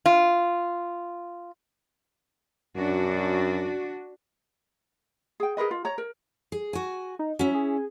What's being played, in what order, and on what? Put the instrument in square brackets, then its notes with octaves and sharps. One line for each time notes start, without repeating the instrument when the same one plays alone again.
[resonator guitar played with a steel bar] F4
[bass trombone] F#2 [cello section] D4 F#4
[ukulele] G#4 G5
G#4 A#4 B4 D#5
F4
C#5 A#5
A#4
[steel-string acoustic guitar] G#4
F#4 G#5
[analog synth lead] D#4
[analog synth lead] F#3 [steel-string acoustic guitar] C#4 E4
[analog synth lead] G#4